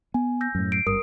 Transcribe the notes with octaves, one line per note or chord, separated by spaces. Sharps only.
B3 G#5
E6 G6 A#6
F#2 A2
C7 D7
G#1 G2 A#4 D#6